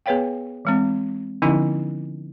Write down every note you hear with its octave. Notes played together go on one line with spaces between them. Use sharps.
B3 G#4 B4 C#5 F5 G5
E3 G#3 C4
D3 F3 B3 C#4 D#4 E4